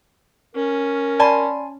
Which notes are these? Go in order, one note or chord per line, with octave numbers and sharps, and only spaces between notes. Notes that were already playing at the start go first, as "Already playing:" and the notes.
C#4 A#4
D5 G#5 A5 B5 C6